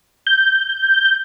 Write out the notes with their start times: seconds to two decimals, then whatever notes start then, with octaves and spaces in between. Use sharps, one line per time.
0.27 G6